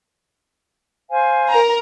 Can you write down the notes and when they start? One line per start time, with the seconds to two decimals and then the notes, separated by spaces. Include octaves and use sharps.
1.10 C5 F5 G#5
1.50 A#4 A#5